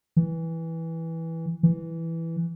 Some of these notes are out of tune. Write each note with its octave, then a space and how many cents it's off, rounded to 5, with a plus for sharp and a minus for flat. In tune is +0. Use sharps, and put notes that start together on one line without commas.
E3 -10
E3 +0